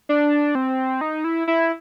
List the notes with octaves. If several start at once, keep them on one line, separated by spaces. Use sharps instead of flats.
D4
C4
D#4
E4
E4